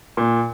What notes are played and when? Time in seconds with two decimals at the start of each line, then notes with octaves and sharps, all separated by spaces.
0.17 A#2